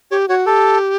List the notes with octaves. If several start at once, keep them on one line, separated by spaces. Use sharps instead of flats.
G4 C#5
F#4 C#5
G4 A4